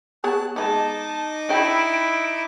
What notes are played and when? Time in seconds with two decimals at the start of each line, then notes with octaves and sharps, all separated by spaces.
0.24 B3 G#4 C#5 A5 F#6
0.56 G#3 B3 D#4 D#5 A5 D6
1.49 D4 E4 F#4 G5 D7